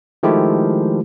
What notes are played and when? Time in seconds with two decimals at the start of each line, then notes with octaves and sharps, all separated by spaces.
0.23 D#3 F3 G#3 A3 E4 G4